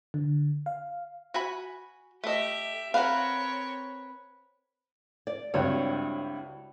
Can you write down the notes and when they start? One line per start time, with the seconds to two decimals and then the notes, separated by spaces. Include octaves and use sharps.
0.14 D3
0.66 F5
1.34 F#4 G#5 B5
2.24 A3 G4 D#5 E5
2.94 C4 A#4 B4 C#5 F5 F#5
5.27 D5
5.54 C#2 G2 C4 D4 E4 F#4 C#5